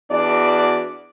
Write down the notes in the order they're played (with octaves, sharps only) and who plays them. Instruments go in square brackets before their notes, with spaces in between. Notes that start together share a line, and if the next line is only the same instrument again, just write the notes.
[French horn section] E2 B3 D4 F#4 D5